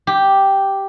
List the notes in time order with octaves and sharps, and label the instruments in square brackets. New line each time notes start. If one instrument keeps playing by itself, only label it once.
[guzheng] G4